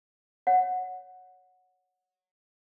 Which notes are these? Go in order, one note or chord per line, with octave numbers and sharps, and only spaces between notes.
C#5 F#5